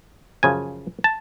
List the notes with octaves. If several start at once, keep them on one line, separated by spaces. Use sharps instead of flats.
F#2 C#3 F3 G#5
A5